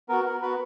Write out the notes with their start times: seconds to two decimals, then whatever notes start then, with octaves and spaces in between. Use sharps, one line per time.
0.09 B3 F#4 A#4
0.25 A#4
0.42 B3 F#4 B4